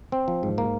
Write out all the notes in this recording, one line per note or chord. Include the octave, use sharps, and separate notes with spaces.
C4
F3
G#2
A#3